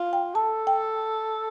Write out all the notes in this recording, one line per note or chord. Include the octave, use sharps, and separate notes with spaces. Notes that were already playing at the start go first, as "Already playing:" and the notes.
Already playing: F4
G5
A4 A5
G5